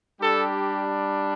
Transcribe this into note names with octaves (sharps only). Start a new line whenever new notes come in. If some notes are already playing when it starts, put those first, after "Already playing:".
G3 D4 G4 A4